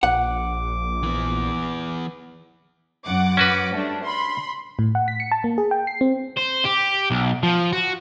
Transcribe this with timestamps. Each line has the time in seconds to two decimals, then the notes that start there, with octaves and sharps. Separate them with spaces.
0.03 A#1 F#5 D6
1.03 E3 B3
3.05 F#2 F#5 D6
3.37 C#4 F#4 B4
3.74 G3 A3 D4
4.04 B5 C6
4.79 A2
4.95 F#5
5.08 B6
5.20 C#7
5.32 A5
5.44 A#3
5.58 G#4
5.71 G5
5.87 C7
6.01 C4
6.37 C5
6.65 G4
7.10 B1
7.43 F3
7.73 F#4